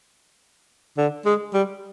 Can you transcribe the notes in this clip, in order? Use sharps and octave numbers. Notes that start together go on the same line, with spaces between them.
D3
G#3
G3